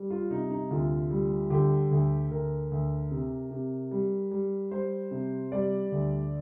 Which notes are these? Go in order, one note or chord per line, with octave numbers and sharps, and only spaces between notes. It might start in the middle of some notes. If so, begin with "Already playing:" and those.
Already playing: G3
F4
C3 D#4
D#4
D2 F4
G3
D3 G4
D2
D2 A#4
D2
C3
C3
G3
G3
G3 C5
C3
G3 D5
D2